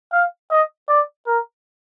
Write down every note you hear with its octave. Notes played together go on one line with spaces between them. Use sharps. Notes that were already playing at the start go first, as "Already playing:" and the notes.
F5
D#5
D5
A#4